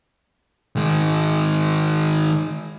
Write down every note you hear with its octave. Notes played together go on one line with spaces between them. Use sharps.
D#3 G#3